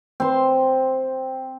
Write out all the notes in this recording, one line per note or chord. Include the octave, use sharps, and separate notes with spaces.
C4 C6